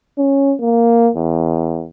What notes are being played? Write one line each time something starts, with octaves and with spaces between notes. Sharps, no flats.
C#4
A#3
E2